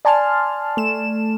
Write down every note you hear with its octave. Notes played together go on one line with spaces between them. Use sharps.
D5 G#5 A5 C6 F6
A3 E7